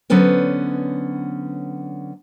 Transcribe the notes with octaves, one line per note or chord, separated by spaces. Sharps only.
D3 F#3 B3 C#4 B4 C5